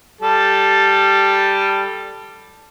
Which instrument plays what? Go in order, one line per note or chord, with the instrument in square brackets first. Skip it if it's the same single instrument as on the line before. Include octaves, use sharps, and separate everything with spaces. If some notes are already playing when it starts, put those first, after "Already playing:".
[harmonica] G3 A4